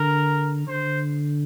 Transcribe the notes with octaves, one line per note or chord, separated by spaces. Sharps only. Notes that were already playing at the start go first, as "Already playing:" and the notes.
Already playing: D3 A#4
D3 C5